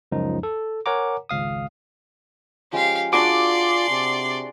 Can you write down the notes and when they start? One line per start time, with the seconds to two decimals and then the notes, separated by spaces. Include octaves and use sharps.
0.12 C#2 F#2 F3 D#4
0.43 A4
0.86 A#4 C#5 F#5 G#5 A#5 D6
1.29 G#1 C#2 F5 D#6
2.73 F3 G#3 C#4 G4 F5
3.13 D4 F4 F#4 G#4 D5 C6 D6
3.90 C3